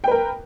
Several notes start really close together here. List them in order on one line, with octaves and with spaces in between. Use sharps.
G5 B4 A#4